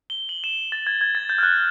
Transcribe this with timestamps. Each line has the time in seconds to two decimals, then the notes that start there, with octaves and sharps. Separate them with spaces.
0.10 G7
0.29 F#7
0.44 E7
0.72 A6
0.87 G#6
1.01 G#6
1.15 A6
1.29 G6
1.38 F6
1.43 F#6